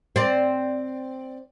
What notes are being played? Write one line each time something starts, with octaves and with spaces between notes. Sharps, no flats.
C4 D5